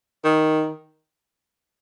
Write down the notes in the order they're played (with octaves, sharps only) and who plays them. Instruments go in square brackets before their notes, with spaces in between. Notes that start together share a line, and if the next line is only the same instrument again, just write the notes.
[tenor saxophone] D#3